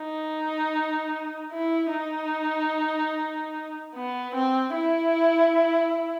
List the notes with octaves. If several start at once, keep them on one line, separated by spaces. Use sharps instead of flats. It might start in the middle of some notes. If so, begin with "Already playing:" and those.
Already playing: D#4
E4
D#4
B3
C4
E4